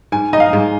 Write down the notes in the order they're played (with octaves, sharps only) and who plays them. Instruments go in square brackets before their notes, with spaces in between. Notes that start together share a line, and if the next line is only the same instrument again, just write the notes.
[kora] G#2 [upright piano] G#5
[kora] D#4 [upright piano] D#5
[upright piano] F5
[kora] G#2